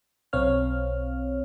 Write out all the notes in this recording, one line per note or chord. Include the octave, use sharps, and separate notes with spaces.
B1 C4 C#5 F5 F6